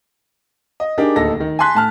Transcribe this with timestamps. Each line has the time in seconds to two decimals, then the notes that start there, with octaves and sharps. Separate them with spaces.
0.80 D#5
0.98 D4 D#4 G4 G#4 A#4
1.16 D1 D#2 D#4 A4 A#6
1.40 D#3
1.59 G#5 A5 C6 F#6 B6
1.75 A2 A5 F6